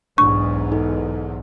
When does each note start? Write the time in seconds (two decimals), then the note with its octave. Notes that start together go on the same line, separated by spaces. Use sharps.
0.18 B1 E2 G#2 D4 C#6
0.72 D#4 A4